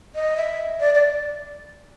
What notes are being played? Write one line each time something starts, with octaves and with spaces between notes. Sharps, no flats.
D#5
E5
D5
D5